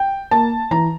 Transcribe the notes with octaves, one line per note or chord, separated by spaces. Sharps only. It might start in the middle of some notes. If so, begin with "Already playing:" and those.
Already playing: G5
A#3 A5
E3 A#5